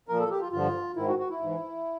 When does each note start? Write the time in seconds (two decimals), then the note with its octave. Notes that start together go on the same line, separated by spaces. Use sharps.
0.08 A#2 F3 A#4
0.20 A4
0.31 G4
0.41 F4
0.52 G2 D3 F3 F4
0.96 G#2 D#3 E4
1.08 F#4
1.19 F#4
1.30 E4
1.40 G#2 E3